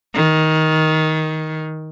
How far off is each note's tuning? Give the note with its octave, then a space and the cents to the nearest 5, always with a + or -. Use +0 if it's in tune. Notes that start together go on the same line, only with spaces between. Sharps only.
D#3 +15